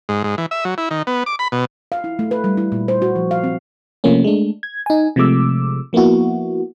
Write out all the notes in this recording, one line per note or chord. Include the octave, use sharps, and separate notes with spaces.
G#2
G#2
E3
E5
F#3
E4
D#3
B3
D6
B5
B2
F5
E4
A3
B4
G3
E4
A#2
C5
F#4
F3
F5
C4
C3 F3 A3 A#3 C#4
G#3 A3 D4
G#6
D#4 G#5
C3 F3 G#3 A3 D6 E6
F3 A#3 B3 E4 F#4